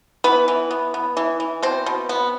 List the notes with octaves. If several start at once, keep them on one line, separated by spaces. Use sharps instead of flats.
E3 B3 B4
E3
B3
B3
E3
E3
B2 C4 C5
B2
B3